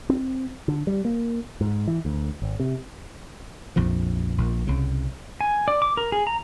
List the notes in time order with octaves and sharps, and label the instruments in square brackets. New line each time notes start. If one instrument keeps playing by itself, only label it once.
[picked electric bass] C4
D3
G3
A#3
G#2
E3
D2
G#1
C3
[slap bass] A#1 F2 F3
A#1 A#2
C2 C#3
[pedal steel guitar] G#5
D5
D6
A#4
G#4
A#5